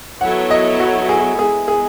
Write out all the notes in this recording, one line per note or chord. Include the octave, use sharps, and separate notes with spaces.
F#3 B3 E4 A4 C#5 F#5
D#5
F#4
G#4
G#3 B3 E4 G#4
G#4